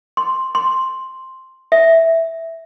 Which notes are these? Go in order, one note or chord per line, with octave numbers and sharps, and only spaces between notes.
C6
C6
E5